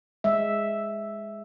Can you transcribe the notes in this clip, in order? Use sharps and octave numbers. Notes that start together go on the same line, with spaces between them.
G#3 E5